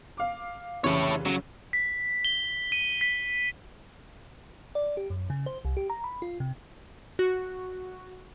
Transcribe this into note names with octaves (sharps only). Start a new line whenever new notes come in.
F5 D6
F1 C#3 E3 E4 C#5
C#3 F#3
B6
G7
D#7
B6
D5
G4
F#2
C#3
C5
C2
G4
A#5
B5
F4
C3
F#4